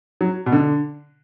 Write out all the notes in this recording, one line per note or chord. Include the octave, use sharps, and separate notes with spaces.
F#3
B2
D3